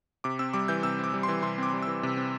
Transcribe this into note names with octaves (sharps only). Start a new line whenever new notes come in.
C3 D6
C4 E6
G3 D6
E3 G6
C3 E6
C4 D6
G3
C6
E3
C3 C6
C4 D6
G3
E3 E6
C3
C4